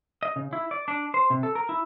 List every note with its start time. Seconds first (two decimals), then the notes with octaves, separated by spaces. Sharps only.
0.23 D#5
0.36 C#3
0.53 E4
0.71 D5
0.88 D4
1.14 C5
1.30 C3
1.43 A4
1.55 A#4
1.69 E4